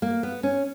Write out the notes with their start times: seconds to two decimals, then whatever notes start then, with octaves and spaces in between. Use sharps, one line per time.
0.02 A#3
0.23 B3
0.43 C#4